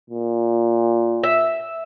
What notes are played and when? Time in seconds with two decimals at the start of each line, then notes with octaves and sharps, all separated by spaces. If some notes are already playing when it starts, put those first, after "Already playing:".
0.10 A#2
1.24 E5